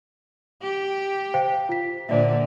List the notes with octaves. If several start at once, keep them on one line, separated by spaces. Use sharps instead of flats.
G4
C5 F5 G5
F4 B6
A#2 D3 C5 D5 E5